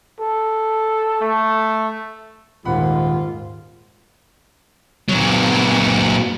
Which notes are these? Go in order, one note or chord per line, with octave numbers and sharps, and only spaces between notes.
A4
A3
D#1 G#2 D#3 F4 F#5 B5
A#2 F#3